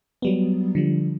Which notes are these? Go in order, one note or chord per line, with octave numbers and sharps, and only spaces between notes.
F#3 G3 B3
D3 F3 G3